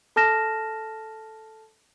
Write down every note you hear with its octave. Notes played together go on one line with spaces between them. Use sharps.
A4 A5 F6 A#6 E7